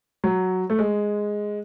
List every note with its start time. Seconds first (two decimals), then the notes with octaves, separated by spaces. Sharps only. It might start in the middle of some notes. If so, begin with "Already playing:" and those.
0.24 F#3
0.70 A3
0.79 G#3